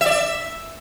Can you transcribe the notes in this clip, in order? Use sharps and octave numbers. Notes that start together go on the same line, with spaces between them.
E5
D5
E5